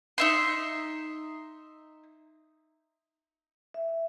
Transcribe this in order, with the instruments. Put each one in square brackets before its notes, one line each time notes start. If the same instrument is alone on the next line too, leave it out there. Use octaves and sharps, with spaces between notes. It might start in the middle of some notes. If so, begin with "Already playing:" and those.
[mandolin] D#4 E5 C6
[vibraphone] E5